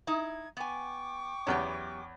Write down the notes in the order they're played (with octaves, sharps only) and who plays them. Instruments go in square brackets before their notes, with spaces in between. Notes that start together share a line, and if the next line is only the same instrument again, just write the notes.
[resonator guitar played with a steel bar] D#4 E4 [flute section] G#6
[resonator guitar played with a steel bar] B3 G#5 [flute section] G5 C#6 D6
[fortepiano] E2 C#4 [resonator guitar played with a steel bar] F#3 B3 G4